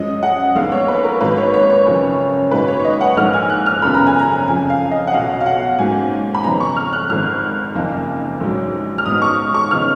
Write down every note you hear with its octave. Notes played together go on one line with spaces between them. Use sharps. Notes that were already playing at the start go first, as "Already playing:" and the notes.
Already playing: F#2 F3 G#3 D#5
F#5
A#1 A#2 G#3 B3 D#4 F5
C#5
B4
A#4
G#1 G#2 F#3 A#3 B4
C#5
C#5
C#5
F#1 F#2 F3
G#2 D#3 F#3 A#3 D#4 B4
C#5
C#5
D#5
F#5
A#1 G#2 F3 A#3 F6
G#5
F#6
F6
F#1 F#2 C#3 F3 B3 B5
A#5
G#5
A#5
F2 C#3 F3 G#5
F5
D#5
F#5
B1 B2 F#3 F5
F5
F#5
G#2 F#3 A#3 C#4 G#5
B5
F2 C#3 F3 B3 D#4 A#5
C#6
F6
F#6
G#1 G#2 F3 F6
F#1 F2 F3 A#3 D#4
A#1 G#2 F#3
F6
G#2 F#3 B3 D#4 D#6
C#6
C#6
C#3 F3 B3 D#4 F6